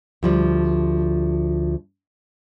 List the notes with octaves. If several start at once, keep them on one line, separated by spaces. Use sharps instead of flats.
D2 F3 G3